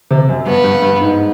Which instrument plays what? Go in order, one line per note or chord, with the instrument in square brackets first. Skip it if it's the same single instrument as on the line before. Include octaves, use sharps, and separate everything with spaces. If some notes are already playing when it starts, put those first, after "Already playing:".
[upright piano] C3
F#2
[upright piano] G2 [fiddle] B3
[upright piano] G2
G2
G#2